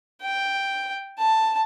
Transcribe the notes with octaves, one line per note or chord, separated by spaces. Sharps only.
G5
A5